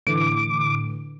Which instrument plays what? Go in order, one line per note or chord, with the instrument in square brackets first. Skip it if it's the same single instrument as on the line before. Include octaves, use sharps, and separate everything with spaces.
[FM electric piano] A2 D3 E3 [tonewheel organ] D6